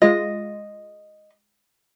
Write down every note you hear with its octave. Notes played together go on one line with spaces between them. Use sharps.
G#3 F4 D#5